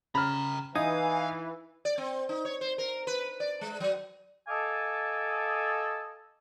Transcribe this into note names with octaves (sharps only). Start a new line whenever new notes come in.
C#3 G5 A#5 B5 F6
E3 D#4 F5 G#5 D#6
D5
C4
D#4
C#5
C5
A#4
B4
D5
G#3
F#3
A4 D#5 F5 G#5 A5 D6